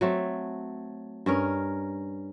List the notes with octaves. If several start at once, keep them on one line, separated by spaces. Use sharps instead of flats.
F#3 A3 C4
G2 C#4 A#4